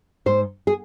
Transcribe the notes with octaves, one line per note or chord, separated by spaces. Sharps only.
G#2 C5
G#4